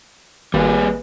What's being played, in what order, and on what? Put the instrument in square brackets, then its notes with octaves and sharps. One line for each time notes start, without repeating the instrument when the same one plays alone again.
[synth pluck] G#1 [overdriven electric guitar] G3 G#4 [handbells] A#3 B4